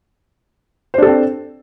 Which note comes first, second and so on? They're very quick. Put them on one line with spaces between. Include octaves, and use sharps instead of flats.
C5 D4 A4 C4